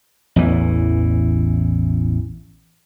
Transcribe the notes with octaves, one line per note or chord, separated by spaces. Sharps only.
A1 E2 E3